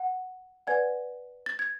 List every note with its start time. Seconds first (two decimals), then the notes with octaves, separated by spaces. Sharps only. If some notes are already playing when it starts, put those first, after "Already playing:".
Already playing: F#5
0.67 B4 D5 F#5 G#5 G#6
1.46 A6
1.59 G#6